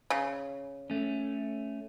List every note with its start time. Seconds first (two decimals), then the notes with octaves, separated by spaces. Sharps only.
0.10 C#3
0.90 A3 C#4